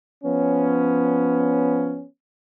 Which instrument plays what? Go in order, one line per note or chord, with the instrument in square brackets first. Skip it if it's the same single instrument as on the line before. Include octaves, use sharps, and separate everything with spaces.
[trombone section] F3 B3 C#4